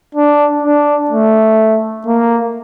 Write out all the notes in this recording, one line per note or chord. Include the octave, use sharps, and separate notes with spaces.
D4
D4
A3
A#3